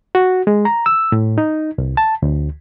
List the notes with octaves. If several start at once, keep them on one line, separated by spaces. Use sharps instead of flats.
F#4
G#3
A#5
E6
A2
D#4
C2
A5
D2